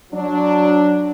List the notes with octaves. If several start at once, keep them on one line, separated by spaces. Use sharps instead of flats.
F#3 D4